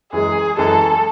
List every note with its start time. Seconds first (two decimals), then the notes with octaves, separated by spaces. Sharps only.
0.12 F#2 E3 G#3 G#4
0.57 F#2 E3 G#3 A4